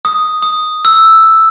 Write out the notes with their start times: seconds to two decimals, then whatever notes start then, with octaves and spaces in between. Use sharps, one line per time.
0.05 D#6
0.43 D#6
0.85 E6